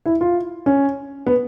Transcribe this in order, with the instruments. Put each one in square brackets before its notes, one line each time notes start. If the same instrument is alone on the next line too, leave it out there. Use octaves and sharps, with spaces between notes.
[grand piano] E4
F4
C#4
B3